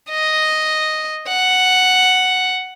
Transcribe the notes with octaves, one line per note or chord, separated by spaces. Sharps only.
D#5
F#5